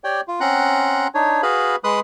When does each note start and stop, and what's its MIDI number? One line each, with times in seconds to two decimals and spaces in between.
0.04 0.21 67
0.04 0.21 73
0.04 0.21 74
0.04 0.21 79
0.28 0.40 65
0.40 1.08 60
0.40 1.08 61
0.40 1.08 78
0.40 1.08 82
0.40 1.08 84
0.40 1.08 90
1.14 1.42 62
1.14 1.42 63
1.14 1.42 73
1.43 1.76 66
1.43 1.76 68
1.43 1.76 71
1.43 1.76 77
1.43 1.76 83
1.84 2.00 56
1.84 2.00 71
1.84 2.00 83
1.84 2.00 84
1.84 2.00 87
1.84 2.00 90